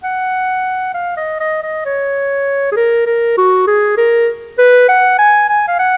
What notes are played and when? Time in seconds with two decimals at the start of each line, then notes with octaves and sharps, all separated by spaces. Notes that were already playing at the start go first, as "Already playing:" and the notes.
0.03 F#5
0.94 F5
1.17 D#5
1.40 D#5
1.63 D#5
1.85 C#5
2.72 G#4
2.76 A#4
3.06 A#4
3.37 F#4
3.67 G#4
3.97 A#4
4.58 B4
4.89 F#5
5.18 G#5
5.49 G#5
5.68 F5
5.79 F#5